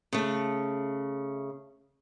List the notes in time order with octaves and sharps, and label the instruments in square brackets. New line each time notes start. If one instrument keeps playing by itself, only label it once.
[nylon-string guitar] C#3 A3